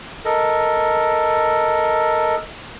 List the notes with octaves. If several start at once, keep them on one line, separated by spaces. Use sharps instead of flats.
A4 A#4 D#5